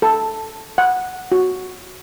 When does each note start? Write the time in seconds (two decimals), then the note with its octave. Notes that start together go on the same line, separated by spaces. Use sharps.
0.02 A4
0.78 F#5
1.32 F#4